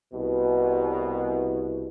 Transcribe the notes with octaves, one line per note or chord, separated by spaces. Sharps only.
C2 B2